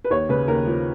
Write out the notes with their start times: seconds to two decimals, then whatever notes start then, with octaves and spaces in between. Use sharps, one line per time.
0.05 B4
0.10 D#2 C#5
0.29 C#3 B4
0.48 D#2 A#4
0.67 F3